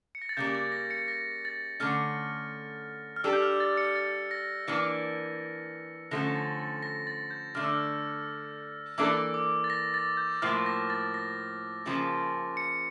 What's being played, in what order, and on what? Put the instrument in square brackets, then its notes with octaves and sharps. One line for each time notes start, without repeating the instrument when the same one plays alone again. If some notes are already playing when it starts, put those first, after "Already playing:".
[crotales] C#7
A#6
A6
[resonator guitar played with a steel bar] C#3 G3 A#3 [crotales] G6
[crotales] A6
A#6
C#7
A#6
A6
[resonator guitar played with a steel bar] D3 A3 C#4 [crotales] F6
[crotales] F6
[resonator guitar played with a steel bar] G3 D4 A4 [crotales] E6
[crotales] G6
F6
A6
C#7
A6
A#6
[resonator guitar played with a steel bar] E3 A#3 D4 [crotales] C#7
[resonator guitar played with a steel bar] D3 F3 A3 C#4 [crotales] A#6
[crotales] A#6
A6
A6
A#6
A6
G6
[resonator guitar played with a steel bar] D3 A3 D4 [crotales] F6
[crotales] E6
F6
[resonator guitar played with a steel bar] E3 A#3 D4 A4 [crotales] E6
[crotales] D6
A6
A#6
A6
G6
[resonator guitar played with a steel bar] A2 F3 A#3 [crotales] F6
[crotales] A#6
A6
A#6
[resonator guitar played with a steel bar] C#3 F3 A#3 C#4
[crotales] C#7